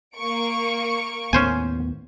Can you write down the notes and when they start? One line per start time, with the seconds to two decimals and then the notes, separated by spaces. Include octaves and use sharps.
0.16 A#3 C#6 D7
1.33 D#2 A2 B3 C#4 C5 G#5